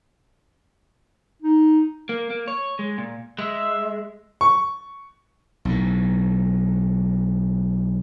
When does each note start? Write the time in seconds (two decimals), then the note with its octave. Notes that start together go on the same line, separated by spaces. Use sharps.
1.42 D#4
2.09 A#3
2.30 A#3
2.48 C#5
2.79 G#3
2.98 A#2
3.39 G#3 E5
4.41 C#6
5.65 B1 A2